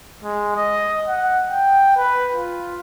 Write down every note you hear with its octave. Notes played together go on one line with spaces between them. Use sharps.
G#3
D#5
F#5
G5
B4
F4